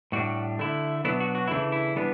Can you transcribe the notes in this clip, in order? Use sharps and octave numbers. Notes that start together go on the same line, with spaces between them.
A2 G3 D4 F#4
D3 A3 E4
B2 F#3 B3 D4 E4
F#4
F#4
C#3 E3 A3 D4 E4
E4
E3 G3 B3 D4